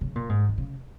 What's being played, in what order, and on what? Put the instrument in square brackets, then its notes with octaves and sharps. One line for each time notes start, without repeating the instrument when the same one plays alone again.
[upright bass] C#3
A#2
G#2
D#3
C#3